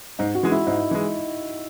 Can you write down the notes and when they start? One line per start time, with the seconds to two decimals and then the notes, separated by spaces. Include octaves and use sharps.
0.19 G#2 D#4
0.35 F#4
0.43 E3 G#3
0.51 E4
0.67 G#2 D#4
0.91 E3 G#3